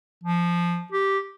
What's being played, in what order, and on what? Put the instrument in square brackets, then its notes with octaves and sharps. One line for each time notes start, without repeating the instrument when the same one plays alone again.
[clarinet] F3
G4